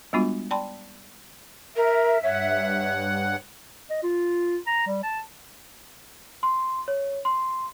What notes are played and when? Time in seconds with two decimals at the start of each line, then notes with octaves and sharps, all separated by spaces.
0.13 G3 G#3 B3 D4 F4 F#4
0.51 D5 G5 A5 B5 C6
1.75 A#4 E5
2.23 G2 C#5 F#5
3.90 D#5
4.03 F4
4.67 A#5
4.87 G3
5.03 A5
6.43 C6
6.88 C#5
7.25 C6